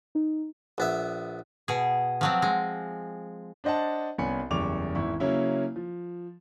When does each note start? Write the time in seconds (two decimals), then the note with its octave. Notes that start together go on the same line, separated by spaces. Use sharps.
0.15 D#4
0.78 A#1 B3 E5
1.68 B2 G#4
2.21 F3 F#3 C4
2.42 G#3
3.64 D4 C5 D#5 F#5 A5
4.18 C2 B3 C#4 G#5 B5 C#7
4.50 F#1 E2 G3 C#6 D6 F7
4.95 G#1 E2 E4 C#6
5.20 C#3 F#3 A#3 C#4 E4
5.76 F3